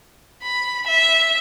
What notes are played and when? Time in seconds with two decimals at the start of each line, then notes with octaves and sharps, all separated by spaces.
0.42 B5
0.87 E5